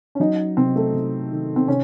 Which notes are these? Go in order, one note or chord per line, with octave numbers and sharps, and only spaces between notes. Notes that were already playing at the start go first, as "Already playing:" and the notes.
C#4
F#3 D#4
C3 C4
A3
C3
D#3
C4
C3 C#4